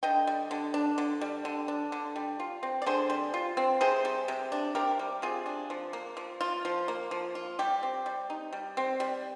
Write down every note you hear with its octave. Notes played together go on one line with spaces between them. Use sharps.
D3 D#5 G5
G3
D3
D4
D3
G3
D3
D4
D3
G3
F4
C4
D5
D3 G#4 C5
G3
F4
C4
C3 G#4 C5
G3
C3
D4
C3 G4 A#4
G3
C3 F4 G#4
D4
F3
A#3
F3
F4
F3
A#3
F3
F4
G3 G4
C4
G3
D#4
G3
C4
G3